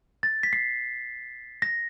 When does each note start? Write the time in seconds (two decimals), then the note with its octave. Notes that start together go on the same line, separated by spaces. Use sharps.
0.23 A6
0.43 B6
0.53 C7
1.62 A#6